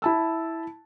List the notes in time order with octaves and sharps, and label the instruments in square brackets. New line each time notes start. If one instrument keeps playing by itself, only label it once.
[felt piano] E4 A5 E6